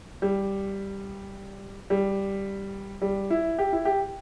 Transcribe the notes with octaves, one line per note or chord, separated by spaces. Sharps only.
G3
G3
G3
E4
G4
E4
G4